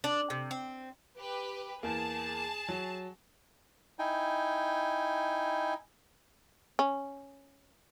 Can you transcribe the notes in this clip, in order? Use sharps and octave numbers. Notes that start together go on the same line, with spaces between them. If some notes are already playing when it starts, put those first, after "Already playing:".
D4
C3
C4
G4 B4
E2 A#3 G#4 A5
F#3
D#4 E4 G5 G#5
C#4